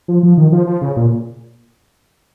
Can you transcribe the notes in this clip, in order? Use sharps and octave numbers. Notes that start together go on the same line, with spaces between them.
F3
F3
D#3
F3
F3
C#3
A#2